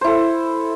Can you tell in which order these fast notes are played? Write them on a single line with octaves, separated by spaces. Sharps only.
C5 E4 A4